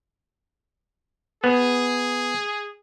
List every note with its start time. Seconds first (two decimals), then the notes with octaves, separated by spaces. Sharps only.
1.44 B3 G#4